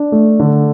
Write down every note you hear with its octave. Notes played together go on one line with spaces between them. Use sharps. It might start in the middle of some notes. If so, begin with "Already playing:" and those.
Already playing: D4
A3
D3